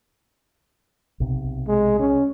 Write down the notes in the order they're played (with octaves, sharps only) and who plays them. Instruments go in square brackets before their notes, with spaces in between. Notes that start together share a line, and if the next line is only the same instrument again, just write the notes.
[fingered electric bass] B1 C3
[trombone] G#3
C#4